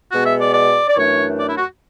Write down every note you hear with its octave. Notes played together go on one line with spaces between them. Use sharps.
B2 G#3 B3 F#4
E5
D5
D5
D5
F#2 E3 A3 D4 C#5
D5
E4
F#4